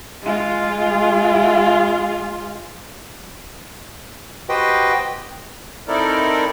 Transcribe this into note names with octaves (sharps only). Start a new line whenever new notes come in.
G#3 F4
F#4 G4 B4 C5 D#5 G5
C4 D#4 E4 A4 A#4 D5